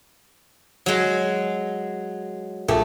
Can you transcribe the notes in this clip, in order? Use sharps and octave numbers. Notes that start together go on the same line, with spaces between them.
F#3 G#3
A#1 A3